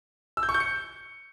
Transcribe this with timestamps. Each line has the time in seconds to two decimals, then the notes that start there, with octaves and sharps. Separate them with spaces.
0.37 E6
0.43 G6
0.49 C#6
0.54 G6
0.60 C#7